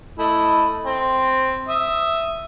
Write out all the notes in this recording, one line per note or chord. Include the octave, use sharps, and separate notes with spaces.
A3 E4 D#5
C4
E5 D#6